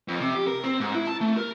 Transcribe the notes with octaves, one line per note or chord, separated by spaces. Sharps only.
F2
C3
G4
A#4
C4
G#2
E4
A5
A3
A#4